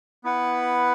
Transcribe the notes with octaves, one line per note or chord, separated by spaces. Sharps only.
B3 E4 B4 F#5